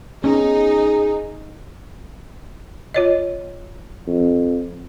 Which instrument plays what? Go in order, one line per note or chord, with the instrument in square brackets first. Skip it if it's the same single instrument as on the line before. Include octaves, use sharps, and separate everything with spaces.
[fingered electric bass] B3 C#4 [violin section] D#4 [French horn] G#4
[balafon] F4 C#5 D#5
[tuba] F2